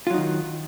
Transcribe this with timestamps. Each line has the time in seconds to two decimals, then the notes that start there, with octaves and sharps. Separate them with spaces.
0.07 F4
0.10 F#3
0.14 D#4
0.18 D#3